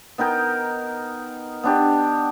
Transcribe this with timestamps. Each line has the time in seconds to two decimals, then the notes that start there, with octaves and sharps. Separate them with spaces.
0.18 B3 D#4 A#4 G5
1.64 B3 D4 G4